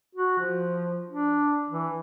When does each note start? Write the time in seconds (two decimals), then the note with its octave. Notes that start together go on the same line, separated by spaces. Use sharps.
0.15 F#4
0.39 F3
1.10 D4
1.70 E3